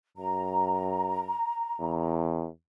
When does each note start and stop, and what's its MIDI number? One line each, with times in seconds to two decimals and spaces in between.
0.17 1.34 42
0.17 2.19 82
1.80 2.48 40